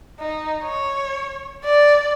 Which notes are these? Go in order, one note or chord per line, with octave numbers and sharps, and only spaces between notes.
D#4
C#5
D5